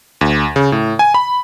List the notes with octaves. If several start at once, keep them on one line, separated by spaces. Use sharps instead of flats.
D2
C#3
A2
G#5
B5